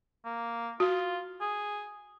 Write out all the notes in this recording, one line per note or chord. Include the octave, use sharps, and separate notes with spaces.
A#3
F4 F#4
G#4